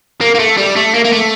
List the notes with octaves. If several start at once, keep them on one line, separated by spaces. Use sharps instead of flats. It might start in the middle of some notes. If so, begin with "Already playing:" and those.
A#3
A#3
A3
G3
A3
A#3
A#3
A3